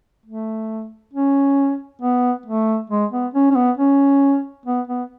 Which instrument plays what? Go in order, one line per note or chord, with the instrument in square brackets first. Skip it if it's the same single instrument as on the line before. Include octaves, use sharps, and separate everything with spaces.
[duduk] A3
C#4
B3
A3
G#3
B3
C#4
C#4
B3
C#4
B3
B3